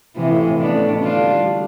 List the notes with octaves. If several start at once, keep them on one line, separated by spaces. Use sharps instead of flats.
C3 E3 F3
A2
A2
A1 B3 D4
A2
A1
D3 D4 F4
G3
D3
G3